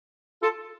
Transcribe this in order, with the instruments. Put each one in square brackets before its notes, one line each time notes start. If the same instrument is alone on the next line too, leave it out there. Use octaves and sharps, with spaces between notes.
[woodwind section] F4 A4